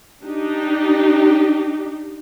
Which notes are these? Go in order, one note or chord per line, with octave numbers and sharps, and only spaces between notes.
D4 D#4 G4